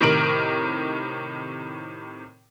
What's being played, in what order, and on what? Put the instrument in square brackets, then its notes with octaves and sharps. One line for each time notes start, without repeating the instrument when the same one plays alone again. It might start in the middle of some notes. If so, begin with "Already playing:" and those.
[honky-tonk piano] A2 C3 D#3 A#4 D7 F#7